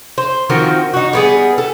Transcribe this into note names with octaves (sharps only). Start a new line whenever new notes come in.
C5
D#3 F3 C4 F#4
D#4 F#4
G3 B3 G#4
A4